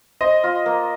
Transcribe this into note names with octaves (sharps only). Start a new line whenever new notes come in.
C5 D#5
F4
A#3